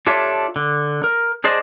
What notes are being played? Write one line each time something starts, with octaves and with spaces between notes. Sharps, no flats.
D4 F4 G4 A4 C#5 E5
D3
A#4
D4 G#4 C5 D5 D#5